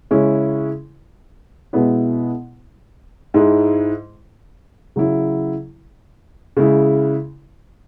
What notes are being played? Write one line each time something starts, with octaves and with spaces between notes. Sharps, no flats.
C#3 G#3 C#4 E4
B2 G#3 B3 E4
G#2 G#3 E4
C#3 F#3 E4
C#3 G#3 E4